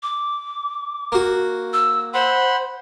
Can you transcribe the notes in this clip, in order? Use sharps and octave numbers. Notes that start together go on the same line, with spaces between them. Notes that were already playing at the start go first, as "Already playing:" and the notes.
D6
A#3 F#4
E6
C5 F#5 B5 C6